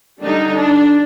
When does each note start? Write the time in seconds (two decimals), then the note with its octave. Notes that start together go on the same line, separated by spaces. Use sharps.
0.22 D3 G3 D4 D#4
0.54 D4